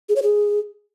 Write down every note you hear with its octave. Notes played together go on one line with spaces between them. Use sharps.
G#4
C#5
G#4